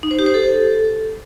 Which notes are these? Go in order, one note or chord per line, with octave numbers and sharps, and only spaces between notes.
D#4
C5
G4
C5
A4